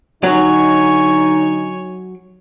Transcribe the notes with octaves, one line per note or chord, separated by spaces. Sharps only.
D3 F#3 D#4 C#5 G#5